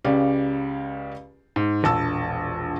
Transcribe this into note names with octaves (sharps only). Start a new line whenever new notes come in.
C#2 C#3 G4 D5
G#2
E1 A#1 A5 E6